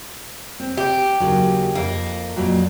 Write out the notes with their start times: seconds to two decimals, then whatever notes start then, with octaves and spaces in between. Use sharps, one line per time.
0.60 C4
0.78 G4
1.20 D#2 C#3 F#3
1.75 F2 A#3
2.36 F2 A#2 F#3